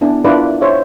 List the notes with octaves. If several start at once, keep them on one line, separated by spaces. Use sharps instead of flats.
B3 D4 E4 G#5
D4 E4 F4 A#4 B4 D5
C5 C#5 E5